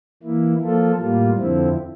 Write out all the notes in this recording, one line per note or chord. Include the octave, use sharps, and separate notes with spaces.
E3 A#3 E4
F3 A#3 F4 A4
A2 G3 A#3 F4
F2 D3 F3 C4 E4